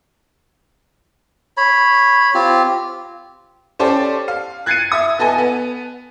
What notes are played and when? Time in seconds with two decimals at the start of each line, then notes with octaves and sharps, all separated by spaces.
1.57 C#5 B5
2.34 C4 F4 G4
3.79 C#4 G4 A4 C5 D5
4.28 F5
4.66 F#6 G#6 A6 C7 C#7 D#7
4.92 E5 D#6
5.19 B3 A4 D#5 G#5
5.38 B3